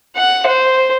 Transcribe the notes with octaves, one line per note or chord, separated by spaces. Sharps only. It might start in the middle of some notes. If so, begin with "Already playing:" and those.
F#5
C5